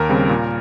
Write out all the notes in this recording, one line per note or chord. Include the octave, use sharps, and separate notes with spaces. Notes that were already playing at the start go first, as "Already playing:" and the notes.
Already playing: D#2 A#4
C#3 G3 C4
A#2